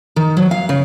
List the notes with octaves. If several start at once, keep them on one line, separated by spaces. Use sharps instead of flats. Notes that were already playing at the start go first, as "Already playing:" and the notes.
D#3
F#3
F5
C#3